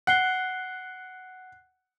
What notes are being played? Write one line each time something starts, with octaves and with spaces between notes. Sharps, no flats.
F#5 F#6 C7 G7